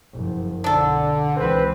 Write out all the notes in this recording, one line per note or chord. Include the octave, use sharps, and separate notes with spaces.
F#1 F3
B1 D3 D4 A4
C#2 E3 C4 B4